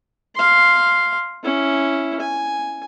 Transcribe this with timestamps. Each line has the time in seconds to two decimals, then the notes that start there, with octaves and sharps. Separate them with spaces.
0.36 F5 C6
1.43 C#4 E4
2.20 G#5